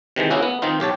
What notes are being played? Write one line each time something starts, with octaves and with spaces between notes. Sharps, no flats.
C3 D#3 E3 G#3
A#3 C#4 E4 F#4 G#4
B3
D#3 C4 D#4 F4
B1 G4 C#5 A5